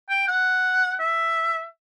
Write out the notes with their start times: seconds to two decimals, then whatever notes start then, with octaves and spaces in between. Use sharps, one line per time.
0.09 G5
0.28 F#5
1.00 E5